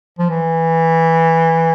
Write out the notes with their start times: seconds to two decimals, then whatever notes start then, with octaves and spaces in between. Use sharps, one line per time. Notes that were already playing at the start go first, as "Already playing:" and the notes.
0.19 F3
0.30 E3